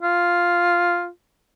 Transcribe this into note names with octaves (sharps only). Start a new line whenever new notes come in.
F4